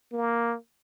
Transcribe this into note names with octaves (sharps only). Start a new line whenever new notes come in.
A#3